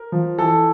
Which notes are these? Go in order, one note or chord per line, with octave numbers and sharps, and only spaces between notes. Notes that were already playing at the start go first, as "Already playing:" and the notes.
Already playing: A#4
F3
E3 A4